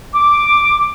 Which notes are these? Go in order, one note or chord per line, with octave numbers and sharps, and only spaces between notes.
D6